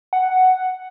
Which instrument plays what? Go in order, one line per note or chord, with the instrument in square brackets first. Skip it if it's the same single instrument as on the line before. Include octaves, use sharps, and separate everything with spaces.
[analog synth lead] F#5